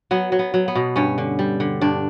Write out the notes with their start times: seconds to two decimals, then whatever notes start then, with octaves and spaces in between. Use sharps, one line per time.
0.11 F#3 B3
0.32 F#3
0.39 B3
0.54 F#3
0.68 B3
0.75 B2
0.96 G2 C#4
1.18 D3
1.39 G3
1.60 D3
1.81 G2 D4